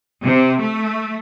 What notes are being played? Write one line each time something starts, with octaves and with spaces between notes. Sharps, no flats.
C3
A3